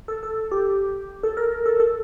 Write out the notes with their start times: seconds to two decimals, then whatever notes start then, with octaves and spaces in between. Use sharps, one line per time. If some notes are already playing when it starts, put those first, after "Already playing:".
0.08 A4
0.23 A4
0.51 G4
1.23 A4
1.37 A#4
1.66 A4
1.80 A4